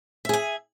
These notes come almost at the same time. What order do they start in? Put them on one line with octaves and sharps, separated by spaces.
E5 G#4 G#5